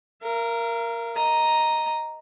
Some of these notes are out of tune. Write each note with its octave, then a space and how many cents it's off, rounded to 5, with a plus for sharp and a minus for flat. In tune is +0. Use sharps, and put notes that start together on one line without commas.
A#4 +0 F5 -40
D#5 +0 A#5 +0